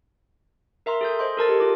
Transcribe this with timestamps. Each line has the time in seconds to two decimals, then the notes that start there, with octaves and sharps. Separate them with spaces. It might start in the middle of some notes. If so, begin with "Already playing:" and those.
0.86 A#4 E5 A#5 C6
1.01 G#4 A4 G6
1.19 C5 D#5 C6
1.37 A4 A#4 A5 A6
1.48 G4 D#5
1.60 F4 D6